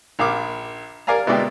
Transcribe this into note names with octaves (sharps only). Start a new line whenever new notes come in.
A#1 F5 D6
A#4 D5 F5 G#5 A#5
B2 G#3 E4 D5 G5